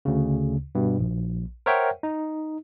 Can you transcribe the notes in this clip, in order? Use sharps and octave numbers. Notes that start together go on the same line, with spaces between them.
D2 C#3
G2 B2
A#1
A#4 C5 C#5 E5 F#5 G5
D#4